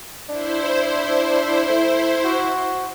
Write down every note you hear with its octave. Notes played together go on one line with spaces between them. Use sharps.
D4 E4 C5
A3
F#4